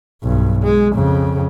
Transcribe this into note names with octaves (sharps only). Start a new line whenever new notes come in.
B1 G2
G#3
F2 C#3